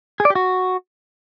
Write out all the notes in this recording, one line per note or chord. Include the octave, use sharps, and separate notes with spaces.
G#4
D5
G4
F#4